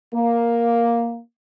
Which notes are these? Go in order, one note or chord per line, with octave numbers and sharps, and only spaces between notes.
A#3